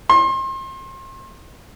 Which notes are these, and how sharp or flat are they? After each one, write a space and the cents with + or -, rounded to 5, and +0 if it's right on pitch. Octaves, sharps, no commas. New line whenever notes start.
C6 +35